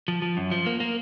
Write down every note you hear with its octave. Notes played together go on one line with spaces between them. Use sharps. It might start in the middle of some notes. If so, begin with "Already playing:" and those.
F3
F3
F#2
F3
A#3
A#3